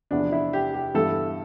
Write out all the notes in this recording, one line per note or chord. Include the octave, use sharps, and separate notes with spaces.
E2 C3 F3 B3 D4
E4
G4
G4
G2 E3 G3 B3 A4